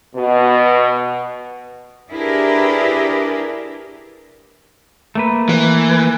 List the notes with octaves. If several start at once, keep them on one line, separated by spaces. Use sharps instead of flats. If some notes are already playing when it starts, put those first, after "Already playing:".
B2
D4 E4 G4 G#4 A#4 B4
A3 A#3 B4
E3